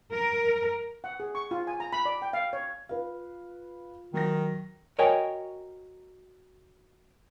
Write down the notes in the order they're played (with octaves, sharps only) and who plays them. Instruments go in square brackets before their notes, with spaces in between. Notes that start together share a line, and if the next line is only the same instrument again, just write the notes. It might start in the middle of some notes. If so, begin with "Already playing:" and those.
[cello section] A#4
[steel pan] F#5
G#4
C#6
F4
G#5
A#5
B5
D5
G5
F5
C#5
[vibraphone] F4 [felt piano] B4 F5
[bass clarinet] D#3 [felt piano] F#3 A#6
[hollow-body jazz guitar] F#4 A#4 C#5 D#5 G5 G#5